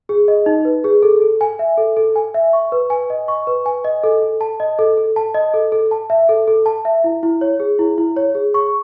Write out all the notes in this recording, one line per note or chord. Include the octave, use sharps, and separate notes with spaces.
G#4
D#5
D#4
B4
G#4
A4
A4
G#5
E5
A4
A4
G#5
E5
C#6
B4
G#5
D#5
C#6
B4
G#5
D#5
A4
A4
A5
D#5
A4
A4
A5
D#5
A4
A4
A5
E5
A4
A4
A5
E5
E4
E4
C#5
G#4
E4
E4
C#5
G#4
C#6